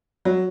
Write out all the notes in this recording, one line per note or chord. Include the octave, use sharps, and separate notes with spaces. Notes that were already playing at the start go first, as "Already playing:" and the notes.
F#3